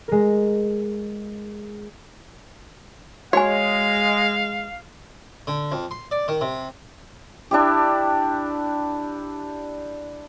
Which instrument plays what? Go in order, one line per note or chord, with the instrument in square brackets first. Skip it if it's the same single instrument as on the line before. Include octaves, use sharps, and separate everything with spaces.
[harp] G#3 A#4
[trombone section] G#3 [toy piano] F#4 G#5 [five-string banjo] C#5 [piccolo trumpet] F5
[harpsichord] D3
F2
C6
D5
D#3
C3
[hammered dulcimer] D4 E4 G4